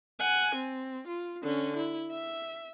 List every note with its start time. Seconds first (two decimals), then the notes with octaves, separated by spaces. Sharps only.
0.20 F#5 G#5
0.55 C4
1.07 F4
1.43 D3 C#4
1.77 E4
2.11 E5